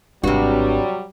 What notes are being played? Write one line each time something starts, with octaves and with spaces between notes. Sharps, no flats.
G#1 G2 C3 F#3 G3 F#4